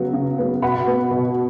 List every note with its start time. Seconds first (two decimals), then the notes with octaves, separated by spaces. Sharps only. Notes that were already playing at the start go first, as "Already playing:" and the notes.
Already playing: C#3 F#3 B3 F#5
0.13 C#3
0.38 F#3 B3
0.62 B2 F#5 B5
0.87 B3
1.11 B2